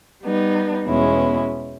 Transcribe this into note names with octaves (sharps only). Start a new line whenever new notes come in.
G3 B3 D#4
E2 B2 G#3 C#4 E4